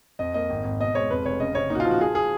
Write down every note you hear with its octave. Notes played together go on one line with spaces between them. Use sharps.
F2 D#5
A#3 D#5
G#1
G#1
B2 D#5
G#3 C#5
F2 B4
F1 C#5
C#3 D#5
C#3 C#5
A#2 D#4
F#4
F4
F3
F#4
F3 G#4
G#4